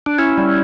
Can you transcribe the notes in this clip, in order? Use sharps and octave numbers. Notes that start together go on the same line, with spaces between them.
D4
C#4 E4
G3